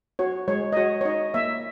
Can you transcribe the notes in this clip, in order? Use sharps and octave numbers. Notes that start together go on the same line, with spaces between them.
F#4 C#5
G#3 C#5
D#5
F#4 C#5
C#5
D#4 D#5
A#3 E5